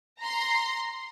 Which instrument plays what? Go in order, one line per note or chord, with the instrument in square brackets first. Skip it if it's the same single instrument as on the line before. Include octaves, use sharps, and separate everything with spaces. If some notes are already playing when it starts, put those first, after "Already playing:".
[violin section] A#5 C6